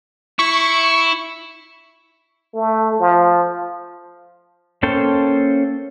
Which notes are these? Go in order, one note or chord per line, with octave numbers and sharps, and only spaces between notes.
E4 C#6
A3
F3
A#3 C#4 A4 C5 G5